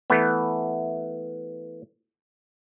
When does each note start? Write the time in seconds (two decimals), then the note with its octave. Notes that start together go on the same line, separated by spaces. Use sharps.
0.10 E3 A3 B3